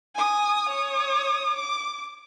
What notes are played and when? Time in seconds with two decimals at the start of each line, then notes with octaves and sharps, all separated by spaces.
0.15 G#5 D#6
0.69 C#5 D#6
1.56 D6